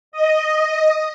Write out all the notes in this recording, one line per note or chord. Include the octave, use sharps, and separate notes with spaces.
D#5